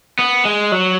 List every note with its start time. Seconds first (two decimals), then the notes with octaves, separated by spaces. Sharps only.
0.19 B3
0.45 G#3
0.72 F#3